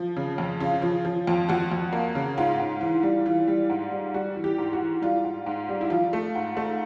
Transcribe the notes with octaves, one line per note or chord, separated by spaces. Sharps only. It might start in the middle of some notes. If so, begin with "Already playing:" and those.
Already playing: F3
C#3
F2
C#3 F4
F3
F3
F2
F2 F#4
F2
A#3
C#3
G#2 F4
G#2
E3
G3
E3 F4
G3
G#2
G3
G3 F#4
E3
G4
G#2
F#4
E3
G3 F4
G#2
G#2
G3
E4
F3 F4
A3
G#2
A3